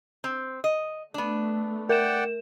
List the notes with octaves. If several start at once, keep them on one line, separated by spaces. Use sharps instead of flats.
C4
D#5
A3 B3 D4
A#4 D5 F#5 G5 E7